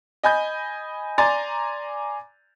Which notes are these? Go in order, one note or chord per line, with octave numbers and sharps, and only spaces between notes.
D#5 G#5 B5 G6
D5 G#5 A#5 C6 A6